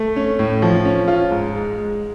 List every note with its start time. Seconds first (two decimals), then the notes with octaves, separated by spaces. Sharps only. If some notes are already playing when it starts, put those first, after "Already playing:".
Already playing: A3
0.16 C#4
0.39 A2
0.62 F3
0.85 C#4
1.08 F4
1.31 G#2
1.55 G#3
1.78 G#3